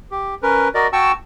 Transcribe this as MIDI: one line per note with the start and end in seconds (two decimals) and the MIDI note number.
0.11 0.35 67
0.43 0.68 61
0.43 0.68 70
0.43 0.68 71
0.74 0.87 66
0.74 0.87 70
0.74 0.87 74
0.74 0.87 75
0.93 1.12 66
0.93 1.12 79
0.93 1.12 81
0.93 1.12 85
0.93 1.12 88